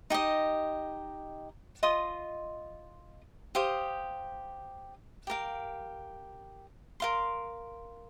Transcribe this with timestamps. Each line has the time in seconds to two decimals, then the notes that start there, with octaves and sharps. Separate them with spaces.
0.10 D#4 G4 D#5
1.83 F4 D#5 C6 D#6
3.55 G4 C5 F5 D#6
5.27 G4 A#4 F5
7.00 A#4 F5 C6